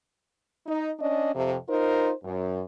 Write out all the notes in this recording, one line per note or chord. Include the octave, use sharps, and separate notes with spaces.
D#4
C#4 D4 D5 D#5
F2 C3
D#4 F4 A#4 C5
F#2